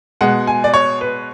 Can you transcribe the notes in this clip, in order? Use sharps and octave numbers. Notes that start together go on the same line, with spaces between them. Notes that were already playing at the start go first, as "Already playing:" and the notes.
B2 G#3 F#5
G#5
D5
C#5
B4